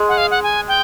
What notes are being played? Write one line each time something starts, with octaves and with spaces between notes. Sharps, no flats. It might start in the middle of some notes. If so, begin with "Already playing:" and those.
Already playing: G#3 G#4
F#5
F5
F#5
G#5
G5